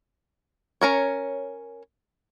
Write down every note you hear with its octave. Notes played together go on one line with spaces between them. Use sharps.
C#4 A#4 C#5